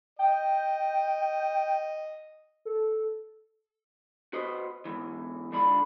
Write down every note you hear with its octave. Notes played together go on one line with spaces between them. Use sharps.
D#5 G5
A4
F#4 B4 C5 D#5
E2 G#2 E3
G#2 D3 D4 F4 B5